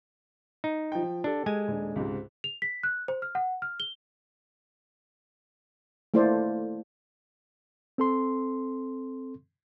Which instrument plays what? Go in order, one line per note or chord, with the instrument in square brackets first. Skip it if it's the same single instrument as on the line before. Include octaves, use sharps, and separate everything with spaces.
[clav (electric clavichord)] D#4
[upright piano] F3 G5
[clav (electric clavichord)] D4 [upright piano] G4 A4
[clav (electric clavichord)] G#3 G#5
[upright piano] D#1 D4
C#2 G#2 C3
[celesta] F7
B6
F#6
C5
F6
F#5
F6
G7
[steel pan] A3 A#3 E4 A4 C5 D5
[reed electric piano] C4 A4 C6